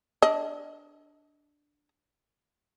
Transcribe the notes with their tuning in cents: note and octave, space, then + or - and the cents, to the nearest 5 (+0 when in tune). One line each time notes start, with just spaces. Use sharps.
D4 +0 D#5 +20